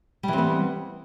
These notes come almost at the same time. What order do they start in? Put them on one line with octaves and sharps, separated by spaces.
G3 E3 C4 B3